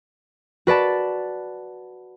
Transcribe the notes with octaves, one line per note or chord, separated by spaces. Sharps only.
F#4 B4 D5 A5